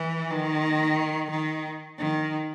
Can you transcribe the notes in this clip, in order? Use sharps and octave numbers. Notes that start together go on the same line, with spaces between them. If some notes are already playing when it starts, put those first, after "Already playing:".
Already playing: E3
D#3
D#3
D#3